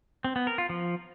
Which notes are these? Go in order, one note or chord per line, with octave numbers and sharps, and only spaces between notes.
C4
B3
A#4
F4
F3